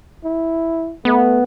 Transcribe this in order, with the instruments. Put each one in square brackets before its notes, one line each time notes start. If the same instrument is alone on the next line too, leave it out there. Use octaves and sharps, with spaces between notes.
[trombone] E4
[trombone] A3 [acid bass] B3